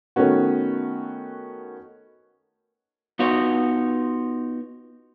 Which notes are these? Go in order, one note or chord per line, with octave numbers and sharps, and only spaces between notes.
D#3 A3 B3 C#4 F#4
B3 D#4 F4 F#4 C#5